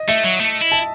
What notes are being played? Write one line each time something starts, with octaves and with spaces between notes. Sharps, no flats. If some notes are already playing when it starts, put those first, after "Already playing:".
Already playing: D#5
A3 E5
F#3
A3
E4
A5